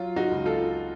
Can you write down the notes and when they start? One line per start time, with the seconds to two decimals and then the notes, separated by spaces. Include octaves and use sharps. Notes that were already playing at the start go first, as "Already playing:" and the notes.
Already playing: F#3 F4
0.16 D#4 F#4
0.31 C#2
0.46 F4 A4